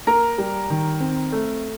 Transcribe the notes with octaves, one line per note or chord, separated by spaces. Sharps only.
A#3 A#4 A#5
G3
D#3
C4
A3